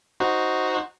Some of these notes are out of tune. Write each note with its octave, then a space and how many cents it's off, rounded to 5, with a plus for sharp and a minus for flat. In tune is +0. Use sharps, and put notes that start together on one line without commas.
D#4 +5 F#4 +0 C5 +0